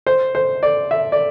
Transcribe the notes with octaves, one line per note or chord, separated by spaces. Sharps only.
C5
C5
D5
E5
D5